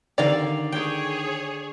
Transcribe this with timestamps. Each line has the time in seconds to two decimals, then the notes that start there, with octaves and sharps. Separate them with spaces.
0.18 D3 D#3 D5 F5 A#5
0.72 G#4 C#5 G5